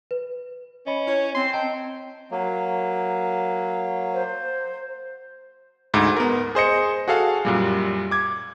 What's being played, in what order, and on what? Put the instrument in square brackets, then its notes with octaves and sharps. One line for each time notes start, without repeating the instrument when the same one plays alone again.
[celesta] B4
[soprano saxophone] C#4 [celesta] D#5 B5 C#7
[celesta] E4 [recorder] C#5
[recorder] C4 [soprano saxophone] C6
[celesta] D#5 A5 A#5 [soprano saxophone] G5
[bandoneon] F#3 A#3
[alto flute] C5
[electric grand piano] D2 G#2
B3 A#4
G#4 C5 D#5 C#7
F#4 G#4 A4 F5
F#2 A#2 G3
D6 G#6